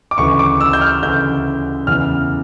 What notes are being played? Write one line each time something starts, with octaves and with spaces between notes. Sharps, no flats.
D6
D2 C#3 E3 C#6
D6
E6
G6
F6
D2 C#3 E3 G6
E2 C#3 E3 F6